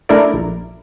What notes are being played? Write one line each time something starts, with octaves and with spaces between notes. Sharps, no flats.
A3 D4 E4 A#4 D5
A#1